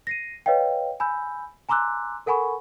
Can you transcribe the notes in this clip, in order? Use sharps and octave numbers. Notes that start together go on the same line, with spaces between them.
A#6 C7 D#7
B4 C#5 D#5 F5 G5
G#5 B5 E6 G6
G#5 A#5 C6 D6 E6 F#6
A4 A#4 F#5 G#5 B5 C#6